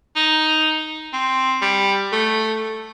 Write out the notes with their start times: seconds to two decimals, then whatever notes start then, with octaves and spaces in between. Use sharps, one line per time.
0.16 D#4
1.13 C4
1.61 G3
2.12 A3